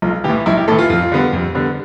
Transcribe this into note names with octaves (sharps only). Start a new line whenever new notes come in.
B1 F4
A2 E3 G4
B1 E4
G4
A2 E3 A4
F4
F2 F4
D3 G3 B3
F2
D3 G3 B3